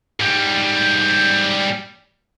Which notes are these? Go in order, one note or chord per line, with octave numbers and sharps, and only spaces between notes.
G#2 G3